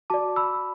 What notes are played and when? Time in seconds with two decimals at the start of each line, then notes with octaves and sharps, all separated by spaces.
0.10 F#4 D5 A5 D6
0.36 B5 E6